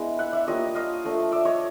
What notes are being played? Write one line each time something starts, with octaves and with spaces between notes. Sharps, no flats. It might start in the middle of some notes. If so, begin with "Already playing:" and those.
Already playing: G#3 B3 D4 E4
E5 F#5
D5 E5
G3 A#3 D4 F4 C#5 D#5
D#5 F5
F3 A3 D4
D5 E5
C#5 D#5